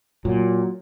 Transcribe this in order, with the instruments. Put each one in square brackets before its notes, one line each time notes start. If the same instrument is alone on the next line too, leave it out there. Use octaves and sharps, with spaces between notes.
[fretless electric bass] A#2 [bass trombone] F#3